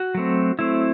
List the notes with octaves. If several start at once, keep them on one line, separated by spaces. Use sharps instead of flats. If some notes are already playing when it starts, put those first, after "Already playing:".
Already playing: F#4
F#3 A3 C4
F#3 A3 C4 E4